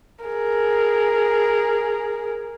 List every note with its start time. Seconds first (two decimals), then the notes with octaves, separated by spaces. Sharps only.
0.25 G#4 A#4